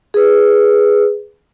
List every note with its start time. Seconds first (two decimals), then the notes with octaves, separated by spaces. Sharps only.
0.14 G#4 B4